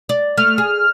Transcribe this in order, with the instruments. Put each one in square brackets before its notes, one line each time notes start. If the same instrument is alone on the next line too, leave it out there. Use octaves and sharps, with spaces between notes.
[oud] D5
[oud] A3 [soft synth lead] F6
[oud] G#4